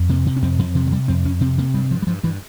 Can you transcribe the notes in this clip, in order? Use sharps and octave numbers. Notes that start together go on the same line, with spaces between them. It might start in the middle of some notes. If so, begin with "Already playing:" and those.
Already playing: F2
C3 A#3
C3
C#4
F2 C4
F2 F3
C3 F3
F3
C3 G3
F2 C4
F2 C#4
C3 C4
C3 A#3
G2 G3
G2 F3
G3
G2 F3
G2 E3